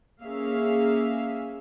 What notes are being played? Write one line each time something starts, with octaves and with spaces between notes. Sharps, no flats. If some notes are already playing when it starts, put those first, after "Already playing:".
A#3 C#4 G#4 E5 F5